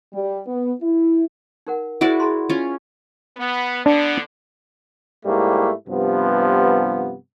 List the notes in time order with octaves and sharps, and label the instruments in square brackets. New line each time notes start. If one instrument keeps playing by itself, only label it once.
[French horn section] G3
B3
E4
[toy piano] D#4 A#4 F#5
[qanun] E4 F#4 D5 [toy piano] G#4 C5 F#5
[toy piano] G#4 A#5 C6
[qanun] C#4 F4
[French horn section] B3
[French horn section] D3 B3 [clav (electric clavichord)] D4
[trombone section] G#2 G3 A3 A#3 E4
G2 C3 F3 B3